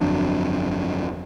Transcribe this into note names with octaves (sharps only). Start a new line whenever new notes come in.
G1 F2 F#3 D4